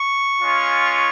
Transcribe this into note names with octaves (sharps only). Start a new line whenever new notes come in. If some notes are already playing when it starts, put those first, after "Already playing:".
Already playing: C#6
G#3 C#4 F4